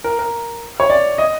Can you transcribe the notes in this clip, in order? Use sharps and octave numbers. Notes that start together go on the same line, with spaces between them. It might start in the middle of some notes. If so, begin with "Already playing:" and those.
A#4
A#4
C#5
D5
D#5